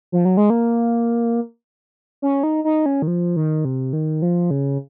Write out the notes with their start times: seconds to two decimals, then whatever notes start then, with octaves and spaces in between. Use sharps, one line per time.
0.12 F3
0.25 F#3
0.37 G#3
0.50 A#3
2.22 C#4
2.43 D#4
2.64 D#4
2.86 C#4
3.02 D#3
3.07 F3
3.36 D#3
3.65 C3
3.93 D#3
4.22 F3
4.51 C#3